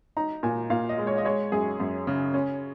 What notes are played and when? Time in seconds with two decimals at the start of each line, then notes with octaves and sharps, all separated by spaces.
0.17 D#4 A#5
0.43 A#2 G#5
0.70 A#2 F5
0.89 D#5
0.98 G#3
1.07 C#5
1.18 D#5
1.25 G#3 C#5
1.52 F#2 G#4
1.80 F#2
2.07 C#3
2.34 C#4